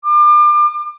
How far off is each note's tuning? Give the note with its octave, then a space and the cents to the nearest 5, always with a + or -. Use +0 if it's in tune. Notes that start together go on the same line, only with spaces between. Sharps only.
D6 +35